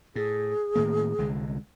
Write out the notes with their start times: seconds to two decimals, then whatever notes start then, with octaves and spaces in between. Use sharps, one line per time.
0.16 A2 G#4
0.75 A2 D#3 A#3
1.18 C2 D3 G#3